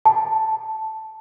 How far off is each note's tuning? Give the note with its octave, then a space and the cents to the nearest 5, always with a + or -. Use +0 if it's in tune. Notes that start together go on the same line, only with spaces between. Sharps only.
A5 -5